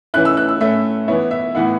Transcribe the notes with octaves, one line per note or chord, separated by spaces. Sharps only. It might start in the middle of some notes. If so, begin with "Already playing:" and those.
E3 C#4 E4 F#6
E6
F#6
E6
A2 A3 C#4 E5
E3 B3 E4 C#5
E5
A2 E3 B3 E4 F#5